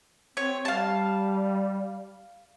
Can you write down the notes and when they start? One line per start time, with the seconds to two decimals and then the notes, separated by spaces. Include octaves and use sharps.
0.37 C4 C#5
0.65 G3 F5 A5